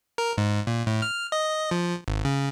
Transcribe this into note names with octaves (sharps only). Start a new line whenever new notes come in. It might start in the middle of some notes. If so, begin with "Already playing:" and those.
A#4
G#2
A#2
A2
F6
D#5
F3
G#1
C#3